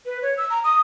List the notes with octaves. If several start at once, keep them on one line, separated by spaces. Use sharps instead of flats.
B4
C#5
E6
A#5
D#6